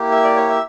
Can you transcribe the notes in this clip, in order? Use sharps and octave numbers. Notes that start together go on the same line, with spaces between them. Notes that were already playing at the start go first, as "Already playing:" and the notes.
Already playing: A#3 E4 G4
E5
D5
C#5
E5